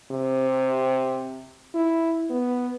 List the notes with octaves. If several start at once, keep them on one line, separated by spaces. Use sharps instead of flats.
C3
E4
B3